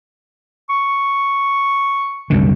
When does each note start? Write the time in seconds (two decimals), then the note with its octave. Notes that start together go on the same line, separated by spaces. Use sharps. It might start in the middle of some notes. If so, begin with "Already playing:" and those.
0.69 C#6
2.30 C2 F#2 D3